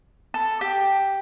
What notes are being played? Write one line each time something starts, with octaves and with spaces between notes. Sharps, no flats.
A4
G4